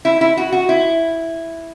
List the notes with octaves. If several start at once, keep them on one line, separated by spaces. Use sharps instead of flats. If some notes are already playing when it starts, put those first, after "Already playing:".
E4
E4
F#4
F#4
E4